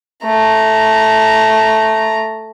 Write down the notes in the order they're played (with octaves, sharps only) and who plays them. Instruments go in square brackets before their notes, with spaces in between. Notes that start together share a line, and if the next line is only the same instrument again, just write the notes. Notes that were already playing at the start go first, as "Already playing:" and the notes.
[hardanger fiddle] A3 A#5